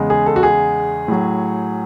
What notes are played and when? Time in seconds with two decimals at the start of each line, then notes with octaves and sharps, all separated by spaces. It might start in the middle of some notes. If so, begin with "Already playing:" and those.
Already playing: E2 C#3 G#3
0.10 G#4
0.26 A4
0.36 F#4
0.43 G#4
1.08 A2 F#3